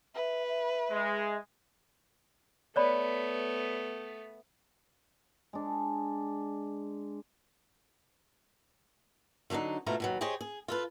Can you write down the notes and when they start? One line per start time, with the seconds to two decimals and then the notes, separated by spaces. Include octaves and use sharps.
0.15 B4 E5
0.47 E5
0.90 G#3
2.76 A3 B3 C#5 D5 B5
5.53 G#3 D4
9.50 D3 F#3 A#3 D4 D#4
9.86 D2 B2 A3 E4 F4 A#5
10.00 D#2 B2 F#3
10.21 G4 G#4 C5 C#5 D#5
10.41 G#4
10.68 F4 A4 B4